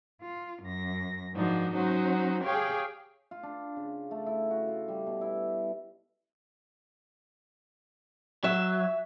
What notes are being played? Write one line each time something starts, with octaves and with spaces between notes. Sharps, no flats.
F4
F#2 A#6
G#2 D#3 F3 D4 D#4 F#4
F#3 C#4 D#4 F#4 C5
G4 G#4 C#5 F5 G5
F4
D4
C#3
A3
E4
F#4
F4
G3
B2
E4
F#3 E5